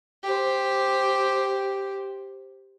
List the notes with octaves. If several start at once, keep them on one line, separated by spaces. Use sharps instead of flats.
G4 C5